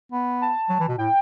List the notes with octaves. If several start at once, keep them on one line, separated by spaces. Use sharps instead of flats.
B3
A5
F#3
E3
B2
A2 G5